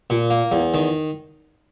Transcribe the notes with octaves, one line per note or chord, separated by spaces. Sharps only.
A#2
A#3
E2
D#3